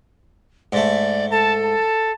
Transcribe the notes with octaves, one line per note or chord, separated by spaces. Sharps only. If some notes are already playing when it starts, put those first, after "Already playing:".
G#2 A3 D5
A4 A5
A5